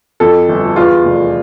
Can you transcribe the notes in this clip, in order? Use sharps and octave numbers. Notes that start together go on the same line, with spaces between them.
F2 A4
G1
E2 F4
F1